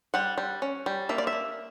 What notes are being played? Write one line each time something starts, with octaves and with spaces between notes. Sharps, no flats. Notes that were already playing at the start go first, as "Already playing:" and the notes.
G3 F#5
G3
C#4
G3
A#3 E5
D5
E5
A#3